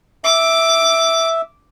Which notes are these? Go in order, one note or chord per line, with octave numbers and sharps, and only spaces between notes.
E5 D6